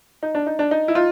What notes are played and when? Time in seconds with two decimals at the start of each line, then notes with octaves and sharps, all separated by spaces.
0.23 D#4
0.35 D4
0.47 D#4
0.59 D4
0.71 D#4
0.88 E4
0.95 D#4 F4